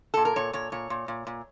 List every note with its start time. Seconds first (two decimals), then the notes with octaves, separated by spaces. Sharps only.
0.14 A#2 A4
0.25 A#4
0.36 A#2 C#5
0.53 A#2 C#5
0.72 A#2 C#5
0.90 A#2
1.08 A#2
1.27 A#2